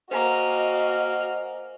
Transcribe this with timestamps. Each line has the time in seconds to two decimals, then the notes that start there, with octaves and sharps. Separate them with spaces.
0.11 A#3 F#4 C5 D#5 G#5 A#5 F6